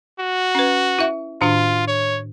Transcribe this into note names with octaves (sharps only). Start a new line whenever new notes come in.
F#4
C#4 B4
E4 E5
A2 D#3 D4 F4
C#5